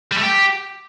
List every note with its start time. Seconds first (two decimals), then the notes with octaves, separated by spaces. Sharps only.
0.12 G3
0.17 A3
0.23 G4